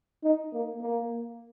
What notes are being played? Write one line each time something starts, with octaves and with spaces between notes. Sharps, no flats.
D#4
A#3
A#3